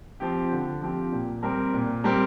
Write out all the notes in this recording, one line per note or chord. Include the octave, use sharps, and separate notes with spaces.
F3 C4 G4
D3
F3 C4 G4
A#2
G3 C4 G4 A#4
A#2
G3 C4 G4 A#4